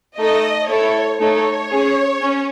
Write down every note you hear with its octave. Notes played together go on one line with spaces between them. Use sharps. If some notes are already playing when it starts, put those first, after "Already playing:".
A3 D#4 A4 D#5
A3 E4 A4 C#5
A3 D#4 A4 C#5
C#4 G#4
C#4